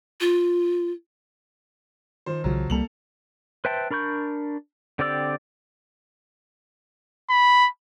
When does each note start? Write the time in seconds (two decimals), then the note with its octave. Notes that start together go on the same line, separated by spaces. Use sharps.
0.21 F4
2.26 D#3 F3 C5
2.44 B1 C#3 F3 F#3
2.70 C2 F#3 G3 A#3 A4 F7 F#7
3.65 B4 C5 E5 G5 A5
3.91 D4 A#4 B5 C#6 G6
4.99 D3 C4 G4 D5 E6
7.30 B5